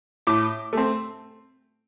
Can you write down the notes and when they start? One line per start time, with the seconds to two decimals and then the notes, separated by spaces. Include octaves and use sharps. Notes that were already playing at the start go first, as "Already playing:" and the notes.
0.27 A2 D6
0.73 A3 C4